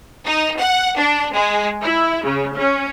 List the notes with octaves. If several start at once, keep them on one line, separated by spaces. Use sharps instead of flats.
D#4
F#5
D4
G#3
E4
C#3
C#4